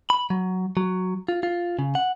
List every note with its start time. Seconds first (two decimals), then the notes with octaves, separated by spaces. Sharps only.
0.10 B5
0.30 F#3
0.77 F#3
1.28 F4
1.43 F4
1.79 C#3
1.95 F#5